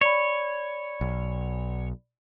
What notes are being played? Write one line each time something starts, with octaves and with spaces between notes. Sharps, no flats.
C#5 D5 B5
B1